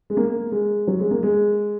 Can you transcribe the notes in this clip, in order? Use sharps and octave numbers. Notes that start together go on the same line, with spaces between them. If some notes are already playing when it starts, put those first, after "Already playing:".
G#3
A#3
G#3
F#3
G#3
A#3
G#3